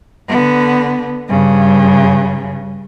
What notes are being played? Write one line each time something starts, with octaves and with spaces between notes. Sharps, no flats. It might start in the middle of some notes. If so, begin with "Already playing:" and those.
D3 B3
G2 C#3